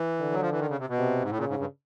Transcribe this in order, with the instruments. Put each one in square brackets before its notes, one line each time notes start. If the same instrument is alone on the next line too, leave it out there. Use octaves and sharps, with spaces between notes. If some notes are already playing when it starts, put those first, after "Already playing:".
Already playing: [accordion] E3
[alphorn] D3
[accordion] F#3
F3
E3
D#3
C#3
C3
B2
[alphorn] C3
[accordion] G#2
A2
[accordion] A#2 [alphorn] C#3
[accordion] G#2
G2